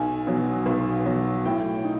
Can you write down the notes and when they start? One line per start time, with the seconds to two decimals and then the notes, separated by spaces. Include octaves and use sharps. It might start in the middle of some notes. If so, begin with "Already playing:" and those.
Already playing: B1 G#5
0.27 B2 F#3
0.66 B1
1.06 B2 F#3
1.45 A2 G5
1.84 D#4